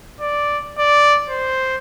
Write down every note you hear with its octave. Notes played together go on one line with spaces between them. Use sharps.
D5
D5
C5